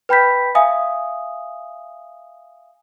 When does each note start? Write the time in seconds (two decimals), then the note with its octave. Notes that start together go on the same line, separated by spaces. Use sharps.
0.09 B4 G5 B5 G6 B6
0.55 E5 F5 G#5 D#6